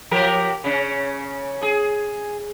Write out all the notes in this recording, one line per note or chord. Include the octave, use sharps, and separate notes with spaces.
F3 G4 A#4
C#3 C#4
G#4